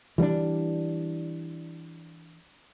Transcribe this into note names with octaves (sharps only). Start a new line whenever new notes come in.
E3 G3 A3 D4